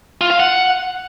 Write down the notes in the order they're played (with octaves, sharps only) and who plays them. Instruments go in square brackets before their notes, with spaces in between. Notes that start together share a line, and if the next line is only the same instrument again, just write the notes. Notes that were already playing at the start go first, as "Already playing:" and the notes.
[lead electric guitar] F4
F5
F#5